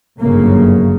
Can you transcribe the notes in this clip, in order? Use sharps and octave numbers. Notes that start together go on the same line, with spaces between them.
G1 F#2 C#3 A#3